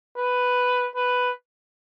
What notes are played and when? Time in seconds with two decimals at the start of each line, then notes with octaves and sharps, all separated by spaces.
0.17 B4
0.95 B4